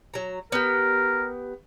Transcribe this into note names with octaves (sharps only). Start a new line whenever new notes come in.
F#3 A#5
B3 G4 A#4